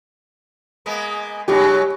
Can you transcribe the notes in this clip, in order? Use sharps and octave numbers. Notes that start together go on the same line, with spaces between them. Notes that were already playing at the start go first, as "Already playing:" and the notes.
G#3 A#3 B3
G2 C#3 F#3 G4